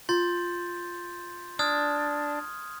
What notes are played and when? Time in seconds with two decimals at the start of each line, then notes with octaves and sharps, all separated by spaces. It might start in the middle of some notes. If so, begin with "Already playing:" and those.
0.09 F4 C6 G6 A6
1.59 D4 D#6 F6 G#6